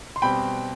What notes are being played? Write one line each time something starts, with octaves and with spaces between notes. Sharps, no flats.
C6
B2 G3 C4 G5 B5